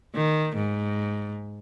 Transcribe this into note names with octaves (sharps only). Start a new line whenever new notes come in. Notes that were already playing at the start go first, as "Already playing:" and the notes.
D#3
G#2